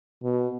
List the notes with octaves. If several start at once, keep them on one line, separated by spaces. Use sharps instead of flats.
B2